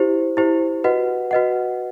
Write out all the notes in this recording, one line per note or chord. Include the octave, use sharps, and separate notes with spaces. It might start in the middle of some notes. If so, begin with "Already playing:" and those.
Already playing: E4 G4 C5
E4 G4 C5
F#4 B4 D#5 F#5
F#4 B4 D#5 F#5